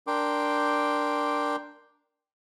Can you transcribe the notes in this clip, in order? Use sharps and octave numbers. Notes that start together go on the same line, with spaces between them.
D4 A#4 G5 C6 D6